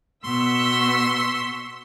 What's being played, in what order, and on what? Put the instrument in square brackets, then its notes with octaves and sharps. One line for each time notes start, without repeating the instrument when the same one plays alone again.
[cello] B2 [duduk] B3 [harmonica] C6 [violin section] C#6 E6 B6